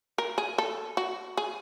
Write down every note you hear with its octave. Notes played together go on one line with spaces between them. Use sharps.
A#4
G#4
A4
F#4
G#4